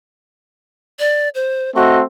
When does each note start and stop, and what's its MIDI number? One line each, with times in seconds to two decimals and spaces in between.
0.99 1.29 74
1.35 1.70 72
1.76 2.02 57
1.76 2.02 60
1.76 2.02 66
1.76 1.97 75